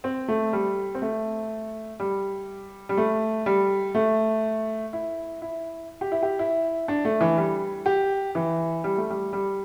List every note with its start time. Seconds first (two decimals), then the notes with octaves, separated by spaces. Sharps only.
0.04 C4
0.28 A3
0.53 G3
0.95 C4
1.02 A3
2.00 G3
2.89 G3
2.97 A3
3.46 G3
3.95 A3
4.93 E4
5.42 E4
6.01 G4
6.12 E4
6.23 G4
6.39 E4
6.88 D4
7.05 A3
7.21 E3
7.37 G3
7.86 G4
8.35 E3
8.84 G3
8.97 A3
9.10 G3
9.33 G3